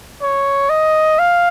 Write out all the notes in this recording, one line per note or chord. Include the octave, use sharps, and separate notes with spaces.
C#5
D#5
F5